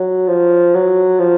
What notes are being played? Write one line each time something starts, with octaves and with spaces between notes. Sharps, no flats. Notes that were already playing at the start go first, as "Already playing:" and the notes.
Already playing: F#3
F3
F#3
F3